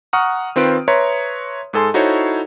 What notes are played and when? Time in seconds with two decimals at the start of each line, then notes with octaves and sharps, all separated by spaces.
0.13 F#5 A#5 C#6 D#6 F6
0.56 D#3 C4 F4 B4 D7
0.88 B4 C#5 E5 A#5 C6
1.73 G#2 G#4 A4 G#5 C6
1.94 D#4 E4 F#4 A4 C5 C#5